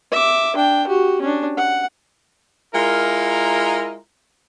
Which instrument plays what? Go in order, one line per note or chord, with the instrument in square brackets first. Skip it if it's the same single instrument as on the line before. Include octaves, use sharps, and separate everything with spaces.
[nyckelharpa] E5 D6
D4 G5
F#4 G4
C#4 D4
F#5
[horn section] G#3 E4 F4 A#4